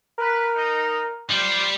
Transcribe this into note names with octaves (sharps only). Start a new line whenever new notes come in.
A#4 B4
D#4
G3 F4 G4 C5